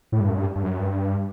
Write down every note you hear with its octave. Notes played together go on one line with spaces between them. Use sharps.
A2
G2
F#2
G2
G2
F#2
G2